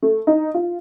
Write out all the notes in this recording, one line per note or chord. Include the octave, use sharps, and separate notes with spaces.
A3
D#4
F4